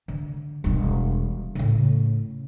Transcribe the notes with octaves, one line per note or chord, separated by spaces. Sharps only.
D3
E1 G3
A2 C#3